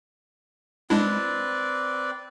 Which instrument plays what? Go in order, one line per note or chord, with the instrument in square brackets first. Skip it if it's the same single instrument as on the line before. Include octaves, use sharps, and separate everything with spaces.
[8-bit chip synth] G#3 D4 E4 [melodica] C4 B4 D5